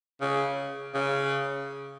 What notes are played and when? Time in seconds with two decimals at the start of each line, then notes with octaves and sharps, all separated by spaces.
0.21 C#3
0.94 C#3